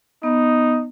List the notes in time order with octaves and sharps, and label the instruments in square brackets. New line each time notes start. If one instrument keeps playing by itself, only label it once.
[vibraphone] B3 [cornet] D#4